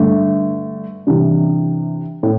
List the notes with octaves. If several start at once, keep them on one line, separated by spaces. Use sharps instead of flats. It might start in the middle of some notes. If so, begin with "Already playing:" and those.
Already playing: G2 D3 A3
C3 E3 G3 D4
A2